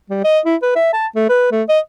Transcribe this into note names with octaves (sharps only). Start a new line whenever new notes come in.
G3
D#5
E4
B4
E5
A5
A3
B4
A3
D#5